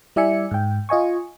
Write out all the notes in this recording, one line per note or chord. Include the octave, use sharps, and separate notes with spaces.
G3 E4 D5 E5 G#5 C#7
G#2 G5
F4 D#5 G#5 C#6